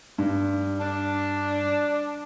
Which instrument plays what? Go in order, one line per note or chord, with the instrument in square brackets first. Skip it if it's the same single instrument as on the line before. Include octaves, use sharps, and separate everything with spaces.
[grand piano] G2
[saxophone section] D4